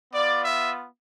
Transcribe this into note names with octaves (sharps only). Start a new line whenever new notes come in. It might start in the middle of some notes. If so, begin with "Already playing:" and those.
B3 F4 D5
E5